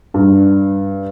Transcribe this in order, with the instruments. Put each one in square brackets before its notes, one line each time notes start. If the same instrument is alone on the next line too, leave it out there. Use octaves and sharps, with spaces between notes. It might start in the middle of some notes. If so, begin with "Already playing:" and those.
[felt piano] G2